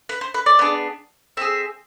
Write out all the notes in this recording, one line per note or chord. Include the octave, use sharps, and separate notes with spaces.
B4
C5
B4
D5
B3 D4 G#4
C4 G#4 E5